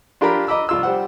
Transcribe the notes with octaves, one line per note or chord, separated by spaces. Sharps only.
D4 F4 G4 A#4 A#5 B5
D#5 A#5 B5 D6 E6
C2 F4 E6
G3 C5 F#5